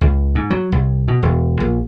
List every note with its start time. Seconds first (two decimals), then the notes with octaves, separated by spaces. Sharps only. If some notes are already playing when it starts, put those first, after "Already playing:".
0.01 C#2
0.35 G#2
0.50 F#3
0.72 C2
1.08 B2
1.22 E1
1.60 A#1